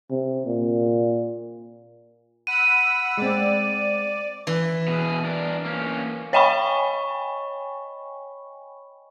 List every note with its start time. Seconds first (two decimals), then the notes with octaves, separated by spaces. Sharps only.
0.10 C3
0.46 A#2
2.47 F#5 B5 E6 D#7
3.17 G#3 C4 D5
4.47 E3
4.87 B2 G#4
5.25 D4 A#4
5.66 A#3 C#4
6.33 C#5 D#5 G5 G#5 B5 C#6